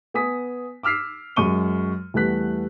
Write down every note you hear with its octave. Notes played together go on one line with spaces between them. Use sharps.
B3 G#5 D#6 B6
D6 E6 F6 B6 C7
F#2 G#3 C#6 D#7 G7
E2 G3 A3 B3 F#6 B6